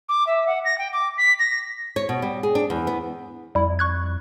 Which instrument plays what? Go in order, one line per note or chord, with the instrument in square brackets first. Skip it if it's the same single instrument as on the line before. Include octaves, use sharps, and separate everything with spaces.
[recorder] D6
E5
F#5
A#6
G5
D6
B6
A#6
[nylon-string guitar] C#5
B2
G3
G#4
D4
E2
B3
[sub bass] F2 [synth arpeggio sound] G3 E4
[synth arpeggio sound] C#6 F#6 G#6